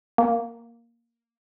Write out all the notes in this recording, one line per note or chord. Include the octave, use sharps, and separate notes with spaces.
A#3